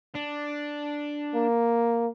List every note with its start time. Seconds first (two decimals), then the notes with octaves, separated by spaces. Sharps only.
0.15 D4
1.34 A#3